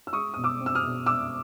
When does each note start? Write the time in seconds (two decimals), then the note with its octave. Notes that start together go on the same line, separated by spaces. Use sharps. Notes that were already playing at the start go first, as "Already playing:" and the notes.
0.07 E6
0.13 G#3 C#6 D#6
0.34 B2 D#6
0.44 D6 E6
0.60 C4
0.66 E6
0.75 D#6 F6
0.83 B2
1.05 B2 D6 E6